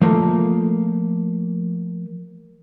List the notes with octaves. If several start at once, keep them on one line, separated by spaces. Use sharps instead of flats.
F3 A3 A#3